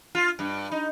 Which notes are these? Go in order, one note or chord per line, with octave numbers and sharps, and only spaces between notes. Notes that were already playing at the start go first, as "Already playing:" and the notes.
F4
G2
D#4